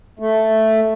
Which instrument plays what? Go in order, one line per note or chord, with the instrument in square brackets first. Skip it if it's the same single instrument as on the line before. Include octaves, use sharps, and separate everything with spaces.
[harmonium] A3